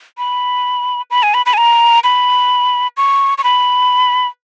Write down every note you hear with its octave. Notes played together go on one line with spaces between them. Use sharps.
B5
B5
G#5
B5
B5
G#5
A#5
B5
C#6
C#6
B5